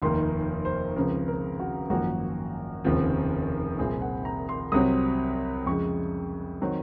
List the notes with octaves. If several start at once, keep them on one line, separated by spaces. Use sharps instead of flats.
F1 D#2 D#3 A#3 C6
C5
C#2 C#3 F3 C4 A#4
A#4
F#4
G#1 F#2 F3 A#3 F#4
F1 D#2 C#3 F3 C4
C2 A#2 F3 C4 G#4
F#5
A#5
C6
C2 C3 F#3 C4 D#6
F2 C#3 G#3 C#6
D#3 F#3 C4